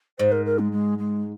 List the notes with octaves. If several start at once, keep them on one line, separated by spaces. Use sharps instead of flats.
G#2 C5
A#4
A#4
G#3
G#3
G#3